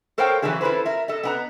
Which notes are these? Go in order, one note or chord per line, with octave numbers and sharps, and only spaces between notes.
A4 A#4 C5 C#5 F5 G5
D3 E3 F#3 A3 E4 G#4
E4 F4 A4 B4 C5
A#4 E5
A4 D#5
B3 D4 A#5